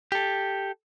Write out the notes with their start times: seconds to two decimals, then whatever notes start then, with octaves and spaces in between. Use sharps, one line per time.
0.12 G4 A4